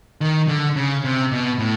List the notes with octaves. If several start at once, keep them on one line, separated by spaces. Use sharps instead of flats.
D#3
D3
C#3
C3
B2
A2